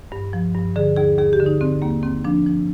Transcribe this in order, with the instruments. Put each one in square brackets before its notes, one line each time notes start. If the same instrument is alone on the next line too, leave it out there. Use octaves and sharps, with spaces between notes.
[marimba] G2
F3
G2
D3 G#4
D#2 G#4
D#2 G#4
G4
D3
D#4
D3 C4
D#2 A#3
D#2 C4
F3 D4
F3